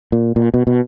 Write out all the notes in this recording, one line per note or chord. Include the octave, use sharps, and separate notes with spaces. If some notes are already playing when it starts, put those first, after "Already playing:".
A#2
A#2
B2
B2